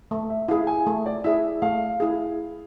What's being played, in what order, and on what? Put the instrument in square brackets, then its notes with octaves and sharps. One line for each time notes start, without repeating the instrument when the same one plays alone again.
[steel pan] A3 [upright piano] E5
[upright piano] E5
[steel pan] E4 G#4 [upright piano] F5
[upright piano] G#5
[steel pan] A3
[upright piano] D5
[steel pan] E4 G#4 [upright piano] E5
[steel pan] A3 [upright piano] F5
[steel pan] E4 G#4